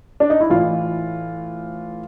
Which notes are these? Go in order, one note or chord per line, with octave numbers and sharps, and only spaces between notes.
D4
D#4
E4
A2 E3 F4